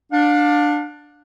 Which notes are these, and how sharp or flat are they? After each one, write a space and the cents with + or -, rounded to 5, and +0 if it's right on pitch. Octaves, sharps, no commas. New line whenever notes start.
D4 +10 F5 +35